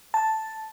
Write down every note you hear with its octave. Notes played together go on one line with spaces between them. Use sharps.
A5